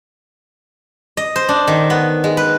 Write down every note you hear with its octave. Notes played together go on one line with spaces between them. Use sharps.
D#5
C5
D4
D#3
B3
G#3
B4